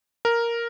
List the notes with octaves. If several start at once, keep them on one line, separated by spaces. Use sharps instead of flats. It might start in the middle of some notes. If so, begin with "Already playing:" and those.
A#4